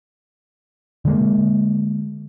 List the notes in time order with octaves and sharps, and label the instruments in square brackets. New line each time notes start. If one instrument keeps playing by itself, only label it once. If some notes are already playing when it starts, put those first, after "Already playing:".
[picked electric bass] D3 G#3 A#3